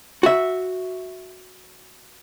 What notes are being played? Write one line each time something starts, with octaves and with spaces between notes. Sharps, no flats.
F#4 E5